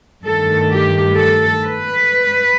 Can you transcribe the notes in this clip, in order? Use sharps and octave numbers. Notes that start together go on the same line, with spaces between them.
G2 D#3 A3 A4
G4
A4
B4